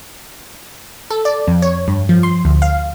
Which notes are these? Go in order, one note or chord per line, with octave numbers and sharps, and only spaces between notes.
A4
D5
F2
C#5
G2
F3
C6
D2
F5